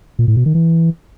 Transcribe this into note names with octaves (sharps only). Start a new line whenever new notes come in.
A#2
A2
B2
D#3
E3